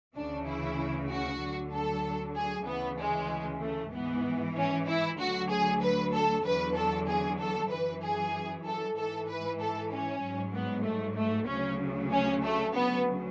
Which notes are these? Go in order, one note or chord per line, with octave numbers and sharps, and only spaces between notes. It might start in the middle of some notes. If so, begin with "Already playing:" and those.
D2 C#3 E3 D4
E4
F#4
D2 D3 F#3
A4
G#4
D2 C#3 E3 B3
G#3
A3
G#2 E3 B3
C#4
E4
D2 D3 F#3 F#4
G#4
B4
A4
E2 D3 F#3 B4
A4
G#4
A4
F#2 E3 B4
G#4
A4
G#2 E3 A4
B4
A4
C#4
G#2 F#3
B3
A3
A3
D2 C#3 F#3 C#4
C#4
A3
D2 C#3 F#3 B3